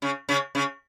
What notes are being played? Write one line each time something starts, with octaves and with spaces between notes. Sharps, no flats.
C#3 C#4
C#3 C#4
C#3 C#4